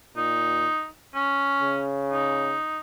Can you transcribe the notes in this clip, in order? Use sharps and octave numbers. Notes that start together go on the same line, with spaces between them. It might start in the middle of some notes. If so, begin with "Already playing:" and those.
A#2 D#4
C#4
C#3
D#4